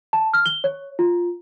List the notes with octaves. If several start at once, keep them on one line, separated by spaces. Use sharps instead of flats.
A5
F6
G7
C#5
F4